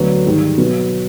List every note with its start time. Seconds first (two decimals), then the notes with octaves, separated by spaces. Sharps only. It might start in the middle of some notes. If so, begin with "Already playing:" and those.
Already playing: D2 D3 F#3 B3
0.25 G#2 D#3 G3
0.58 B2 F#3 B3